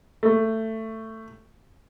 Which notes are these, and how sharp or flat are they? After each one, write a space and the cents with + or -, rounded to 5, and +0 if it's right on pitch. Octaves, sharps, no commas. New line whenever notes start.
A3 +15